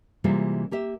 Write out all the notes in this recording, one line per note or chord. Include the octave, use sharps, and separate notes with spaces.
C3 E3 G3 G#3 A#3 F4
A#3 G4 E5